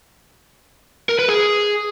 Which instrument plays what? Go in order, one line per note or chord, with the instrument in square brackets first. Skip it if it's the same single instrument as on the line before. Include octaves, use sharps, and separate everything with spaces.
[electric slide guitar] A#4
B4
G#4